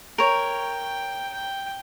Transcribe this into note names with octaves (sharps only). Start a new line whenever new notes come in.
A#4 C#5 G5
G5